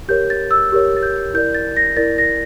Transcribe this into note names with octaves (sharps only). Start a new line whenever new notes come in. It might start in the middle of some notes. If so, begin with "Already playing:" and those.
G4 A#4 C#5 G6
A6
E6
G4 A#4 C#5
A6
G6
E4 A#4 D5 G6
A6
A#6
E4 A#4 D5 A6
A#6